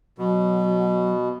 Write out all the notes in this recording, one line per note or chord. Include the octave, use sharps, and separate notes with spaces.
B2 F#3